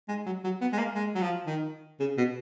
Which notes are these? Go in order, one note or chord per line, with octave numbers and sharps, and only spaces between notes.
G#3
F#3
F#3
B3
G#3
A#3
G#3
F#3
F3
D#3
C#3
B2